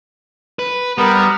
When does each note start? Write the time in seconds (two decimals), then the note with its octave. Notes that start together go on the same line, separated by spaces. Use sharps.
0.59 B4
0.98 G3 B3 A#4